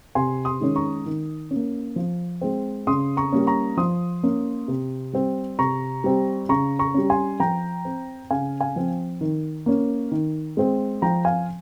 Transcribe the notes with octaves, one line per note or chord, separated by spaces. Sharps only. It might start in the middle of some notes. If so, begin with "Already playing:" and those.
C3 G#5 C6
C6 D#6
D#3 G#3 C#4
A#5 C#6
D#3
C#4
A#3
F3
G#3 C4
C#3 C6 D#6
A#5 C#6
G3 A#3 C#4
A#5 C#6
F3 C6 D#6
A#3 C#4
C3
G3 C4
C3 A#5 C#6
G3 C4
C#3 A#5 C#6
A#5 C#6
G3 C#4
G#5 C6
F3 G5 A#5
C4
C#3 F5 G#5
F5 G#5
F3 C4
D#3
A#3 C#4
D#3
G#3 C4
F3 G5 A#5
F5 G#5